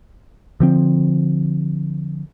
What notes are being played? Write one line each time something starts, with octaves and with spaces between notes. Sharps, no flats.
D3 F3 C4